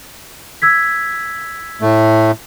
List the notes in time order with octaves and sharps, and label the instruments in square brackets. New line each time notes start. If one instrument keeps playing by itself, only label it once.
[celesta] E6 G#6 B6
[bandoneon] A2 A3